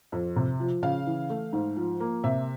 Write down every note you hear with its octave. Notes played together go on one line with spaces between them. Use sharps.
F2
C3
F3
C#3 F5
E3
A3
G#2
F3
A#3
C3 E5